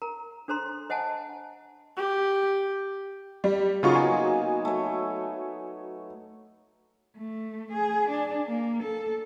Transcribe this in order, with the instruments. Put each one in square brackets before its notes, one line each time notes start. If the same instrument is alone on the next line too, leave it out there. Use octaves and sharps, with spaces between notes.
[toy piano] A#4 A#5
D4 A4 C5 A#5 C6
C5 D#5 F#5 G#5 A5
[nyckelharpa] G4
[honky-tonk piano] G3
[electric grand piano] C#3 F4 C#6 [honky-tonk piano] F#3 [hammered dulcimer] A#3 B3 D#4
[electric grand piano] G#5
[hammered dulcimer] A3 C#5
[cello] A3
G#4
D4
A#3
A4